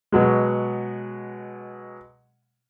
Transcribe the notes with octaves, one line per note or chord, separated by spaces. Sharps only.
B2 F#3 G#3